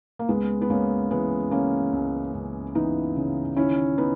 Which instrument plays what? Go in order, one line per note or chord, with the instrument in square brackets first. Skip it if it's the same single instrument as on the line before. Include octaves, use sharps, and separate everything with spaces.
[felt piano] A#3
C#2 G#3 B3
B3
C#2 A#3 C#4
E3 G#3 B3
C#3 A#3 C#4
C#2
C#2
E3 B3 D#4
C#3
D#3 C#4 E4
B3 D#4